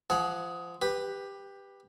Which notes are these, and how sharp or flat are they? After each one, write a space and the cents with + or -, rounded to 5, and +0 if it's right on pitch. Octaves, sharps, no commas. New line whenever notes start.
F3 -20 G#4 +15 F#5 +0
G4 +15 B4 +0